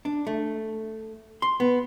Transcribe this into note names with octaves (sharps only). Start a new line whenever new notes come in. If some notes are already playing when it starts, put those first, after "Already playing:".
D4
A3
C6
B3